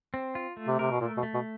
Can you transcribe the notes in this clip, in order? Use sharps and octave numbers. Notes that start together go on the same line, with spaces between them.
C4
F4
A3
C3
C3 A#4
B2
A#2 A3
B2
A3
B2